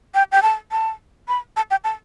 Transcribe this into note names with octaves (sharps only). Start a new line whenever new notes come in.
G5
G5
A5
A5
B5
A5
G5
A5